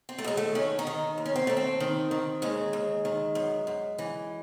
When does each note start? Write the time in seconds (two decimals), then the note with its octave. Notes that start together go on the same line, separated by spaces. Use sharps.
0.09 C4
0.18 A3
0.24 D#2 G#3
0.37 A3
0.55 D#3 C#4
0.79 D#4
0.87 D#3
1.18 D#2
1.26 C#4
1.36 C4
1.47 D#2 A3
1.57 C4
1.80 D#3
2.11 D#3
2.42 D#2 G#3
2.73 D#2
3.05 D#3
3.35 F#2
3.67 F#2
3.98 E3